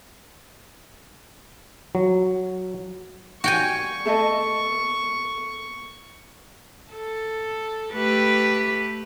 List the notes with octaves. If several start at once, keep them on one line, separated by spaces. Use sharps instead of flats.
F#3
G3 F#4 C#5 F5 G5 G#5 C#6
A3 D#5 E5 A5
A4
A3 G4 B4